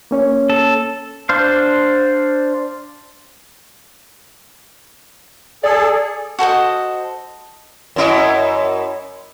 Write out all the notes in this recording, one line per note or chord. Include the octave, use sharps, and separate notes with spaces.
A#3 C#4 C#5
A4
D4 C5 F5
G#4 A4 D5
F#4 A4 C5 D#5
F#2 E4 D#5